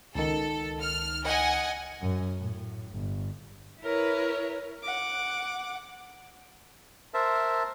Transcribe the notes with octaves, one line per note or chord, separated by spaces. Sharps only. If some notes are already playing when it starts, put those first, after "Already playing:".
C#2 D#3 A4
F6
D#5 F#5 G#5
F#2
A2
G1
E4 A#4 B4 C#5
F#5 D6
A#4 C5 E5 A5